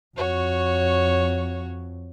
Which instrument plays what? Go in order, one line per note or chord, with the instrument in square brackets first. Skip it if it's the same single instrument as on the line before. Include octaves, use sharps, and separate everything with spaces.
[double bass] F2 [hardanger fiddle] F#4 C#5